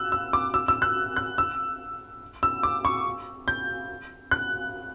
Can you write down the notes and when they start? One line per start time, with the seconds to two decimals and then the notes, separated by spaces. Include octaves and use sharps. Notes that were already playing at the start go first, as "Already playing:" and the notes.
Already playing: E6 F#6
0.12 E6
0.33 D6
0.54 E6
0.68 E6
0.82 F#6
1.16 F#6
1.38 E6
2.43 E6
2.63 D6
2.85 C#6
3.48 G6
4.31 F#6